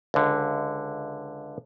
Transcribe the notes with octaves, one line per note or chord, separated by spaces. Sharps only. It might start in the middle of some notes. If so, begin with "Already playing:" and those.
C#2 D3